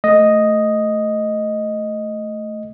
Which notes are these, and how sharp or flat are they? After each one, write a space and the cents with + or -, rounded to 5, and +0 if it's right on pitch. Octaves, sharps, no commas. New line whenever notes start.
A3 +0 D#5 +0